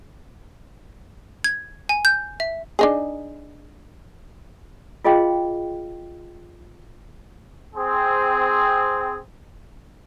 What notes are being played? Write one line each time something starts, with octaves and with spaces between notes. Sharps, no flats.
G#6
G#5
G6
E5
D4 D#4 G#4
F4 G#4 D#5 F5 G5 C6
C4 G#4